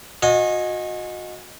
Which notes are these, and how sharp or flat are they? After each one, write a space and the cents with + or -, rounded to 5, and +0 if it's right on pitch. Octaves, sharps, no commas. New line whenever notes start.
F#4 -35 D#5 +0 G#5 +0